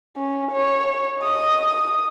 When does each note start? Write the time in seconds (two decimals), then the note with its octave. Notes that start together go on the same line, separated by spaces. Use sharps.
0.16 C#4
0.52 C#5
1.21 D#5 D#6